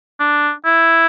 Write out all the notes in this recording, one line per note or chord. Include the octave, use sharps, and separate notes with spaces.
D4
E4